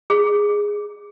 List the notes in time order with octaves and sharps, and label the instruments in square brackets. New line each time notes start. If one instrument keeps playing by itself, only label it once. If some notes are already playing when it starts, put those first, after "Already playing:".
[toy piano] G#4